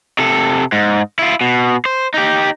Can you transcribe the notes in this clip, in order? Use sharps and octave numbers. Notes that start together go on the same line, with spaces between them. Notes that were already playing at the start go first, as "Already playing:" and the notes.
C3 A4
G#2
E4 F4
B2
C5
D#4 G4